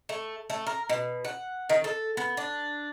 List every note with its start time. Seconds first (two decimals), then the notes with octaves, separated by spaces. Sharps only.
0.09 A3
0.50 A3
0.67 A#4
0.89 B2
1.25 F#5
1.69 D#3
1.84 A4
2.17 B3
2.37 D4